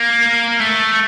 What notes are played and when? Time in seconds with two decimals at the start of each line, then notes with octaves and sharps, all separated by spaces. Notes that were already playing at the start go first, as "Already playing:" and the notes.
Already playing: A#3
0.60 A3